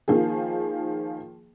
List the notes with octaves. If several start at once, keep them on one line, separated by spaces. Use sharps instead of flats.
D#3 F3 A#3 G#4